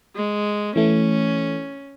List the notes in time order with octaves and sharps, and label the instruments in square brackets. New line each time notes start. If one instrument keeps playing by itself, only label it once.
[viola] G#3
[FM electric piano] E3 A3 [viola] C#4